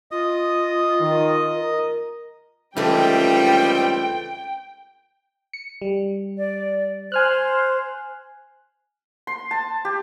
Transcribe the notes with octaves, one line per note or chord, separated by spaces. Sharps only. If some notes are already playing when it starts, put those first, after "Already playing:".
F4 D#5 D#6
D#3
A#4
C#2 D#3 E3 G3 A3 C4 G5
C#7
G3
D5
C5 G#5 F6 F#6
C6
A5
G4